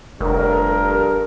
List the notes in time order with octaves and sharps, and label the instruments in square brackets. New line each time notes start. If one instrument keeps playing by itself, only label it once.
[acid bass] F1 [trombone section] G2 A4 A#4